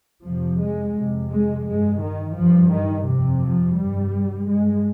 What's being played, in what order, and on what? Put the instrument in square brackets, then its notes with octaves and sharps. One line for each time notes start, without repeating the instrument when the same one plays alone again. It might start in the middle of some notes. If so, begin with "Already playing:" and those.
[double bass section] F2 C3 F3
G#3
F2 C3
G#3
G2 G#3
D#3
G2 F3
D#3
F2 C3
F3
G2 G3
G2 G#3